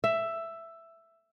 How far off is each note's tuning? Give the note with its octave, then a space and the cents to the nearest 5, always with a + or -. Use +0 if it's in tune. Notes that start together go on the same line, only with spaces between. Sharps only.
E5 +10